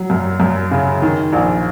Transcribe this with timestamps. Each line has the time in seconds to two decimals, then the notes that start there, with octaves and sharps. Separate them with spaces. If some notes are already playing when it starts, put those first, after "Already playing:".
Already playing: F#3
0.10 F#2
0.40 F#2
0.71 C#3
1.02 D#3
1.33 A#1